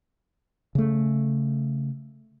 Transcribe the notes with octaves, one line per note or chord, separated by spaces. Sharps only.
C#3 A3